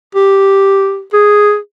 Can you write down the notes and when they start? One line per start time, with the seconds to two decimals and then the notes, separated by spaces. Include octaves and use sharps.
0.15 G4
1.13 G#4